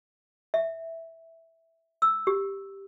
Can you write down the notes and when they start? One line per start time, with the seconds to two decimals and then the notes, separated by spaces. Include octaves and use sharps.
0.54 E5
2.02 E6
2.27 G4